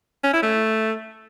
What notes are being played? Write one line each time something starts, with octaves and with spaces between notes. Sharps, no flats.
C#4
E4
A3